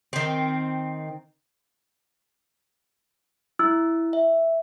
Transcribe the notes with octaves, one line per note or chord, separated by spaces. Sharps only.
D#3 C4
E4 E6
E5